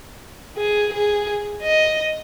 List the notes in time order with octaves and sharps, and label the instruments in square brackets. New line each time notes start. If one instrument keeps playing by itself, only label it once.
[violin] G#4
G#4
D#5